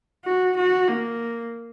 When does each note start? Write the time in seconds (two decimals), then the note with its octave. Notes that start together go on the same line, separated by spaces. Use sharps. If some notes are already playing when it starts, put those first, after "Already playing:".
0.25 F#4
0.57 F#4
0.88 A#3